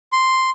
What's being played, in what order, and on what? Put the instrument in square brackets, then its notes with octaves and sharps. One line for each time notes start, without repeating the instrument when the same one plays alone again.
[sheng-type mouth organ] C6